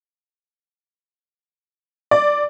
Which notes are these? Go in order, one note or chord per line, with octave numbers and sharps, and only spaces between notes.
D5